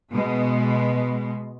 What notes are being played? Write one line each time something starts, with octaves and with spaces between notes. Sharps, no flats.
B2 G#3 B3